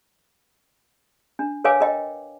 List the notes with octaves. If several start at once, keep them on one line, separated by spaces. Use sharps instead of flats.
D4
A#4 B4 C#5 F5 G#5 D6
A#4 D#5 G5